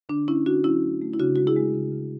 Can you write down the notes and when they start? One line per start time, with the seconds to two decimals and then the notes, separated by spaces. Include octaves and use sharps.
0.09 D3 D4
0.27 A3 C#4 E4
0.46 D3 D4 F#4
0.64 F#3 C#4 E4
0.83 A3
1.01 A3
1.14 E4
1.19 C#3 D4 F#4
1.36 G#3 F#4
1.47 E4 G#4
1.56 G#3
1.74 C#3
1.92 C#3